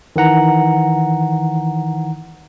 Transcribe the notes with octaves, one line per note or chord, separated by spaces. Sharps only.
D#3 E3 F#5 A#5